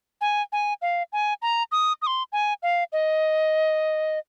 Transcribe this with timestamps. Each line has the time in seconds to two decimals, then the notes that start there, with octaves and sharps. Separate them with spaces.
0.21 G#5
0.52 G#5
0.82 F5
1.13 G#5
1.42 A#5
1.72 D#6
2.02 D#6
2.07 C6
2.32 G#5
2.63 F5
2.92 D#5